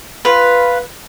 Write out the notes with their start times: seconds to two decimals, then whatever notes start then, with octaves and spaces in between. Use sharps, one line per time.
0.25 F4 B4